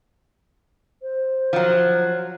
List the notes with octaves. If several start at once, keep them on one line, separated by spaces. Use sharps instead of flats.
C5
F3 F#3